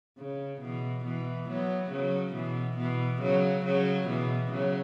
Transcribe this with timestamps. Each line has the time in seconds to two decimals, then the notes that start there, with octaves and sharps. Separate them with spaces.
0.18 C#3
0.61 B2 E3
1.05 B2 E3
1.49 F#3 B3
1.91 C#3 F#3
2.35 B2 E3
2.78 B2 E3
3.21 C#3 F#3
3.65 C#3 F#3
4.08 B2 E3
4.51 C#3 F#3